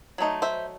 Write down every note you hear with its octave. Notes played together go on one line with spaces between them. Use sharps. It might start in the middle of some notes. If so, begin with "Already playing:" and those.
F#3 A3 D#4
C5 E5